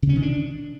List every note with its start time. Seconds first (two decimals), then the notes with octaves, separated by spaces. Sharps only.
0.02 C#3
0.09 C#4
0.16 D#3
0.22 D4